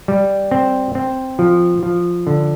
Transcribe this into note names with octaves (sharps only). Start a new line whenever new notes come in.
G3
C4
C4
F3
F3
D3